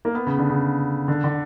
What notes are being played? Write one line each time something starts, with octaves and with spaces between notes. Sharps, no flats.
A#3
B3
C#3
D3
C#3
D3
D3